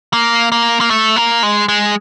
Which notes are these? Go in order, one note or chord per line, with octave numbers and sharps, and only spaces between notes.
A#3
A#3
A#3
A3
A#3
G#3
G#3